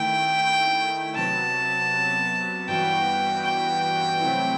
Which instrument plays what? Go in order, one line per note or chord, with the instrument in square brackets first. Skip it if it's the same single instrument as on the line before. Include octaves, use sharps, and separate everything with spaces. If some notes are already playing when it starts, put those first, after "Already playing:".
Already playing: [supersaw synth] D#3 A3 E4 [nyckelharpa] G5
[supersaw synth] C3 F#3 B3 [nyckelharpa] A5
[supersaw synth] G2 E3 G3 B3 F#4 [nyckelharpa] G5
[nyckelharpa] G5
[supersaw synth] C3 F#3 A3 C4 E4